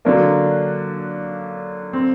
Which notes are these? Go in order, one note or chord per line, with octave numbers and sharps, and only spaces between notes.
D3 F#3 A#3 D4
C4